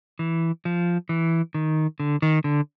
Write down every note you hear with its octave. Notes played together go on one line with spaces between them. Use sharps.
E3
F3
E3
D#3
D3
D#3
D3